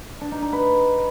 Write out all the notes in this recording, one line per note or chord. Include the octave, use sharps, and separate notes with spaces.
D4
D#4
D#4
B4